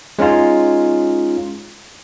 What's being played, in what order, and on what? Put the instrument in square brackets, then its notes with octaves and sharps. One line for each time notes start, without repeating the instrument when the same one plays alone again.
[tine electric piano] G#3 C#4 D#4 F4